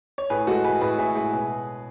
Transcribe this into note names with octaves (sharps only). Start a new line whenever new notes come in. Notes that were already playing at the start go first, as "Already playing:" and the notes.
C#5
A2 G#4 B4
G#3 F#4 A4
G#3 G#4 B4
A2 G#4 B4
A2 E4 G#4
G#3 E4 G#4
B2 G#4 B4